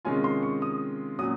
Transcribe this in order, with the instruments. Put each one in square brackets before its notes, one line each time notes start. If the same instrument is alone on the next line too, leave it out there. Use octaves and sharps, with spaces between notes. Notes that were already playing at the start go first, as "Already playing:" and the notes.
[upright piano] C3 D#3 G#3 C#4 F4 [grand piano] G#5
[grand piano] C6
C#6
D#6
[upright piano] A#2 F#3 C#4 [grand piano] D#6